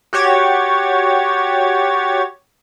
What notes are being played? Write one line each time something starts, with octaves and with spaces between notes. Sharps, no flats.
F#4 G4 C#5 G#6 A6